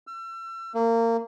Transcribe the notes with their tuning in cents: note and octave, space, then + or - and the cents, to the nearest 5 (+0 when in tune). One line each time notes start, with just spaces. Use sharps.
E6 +35
A#3 -25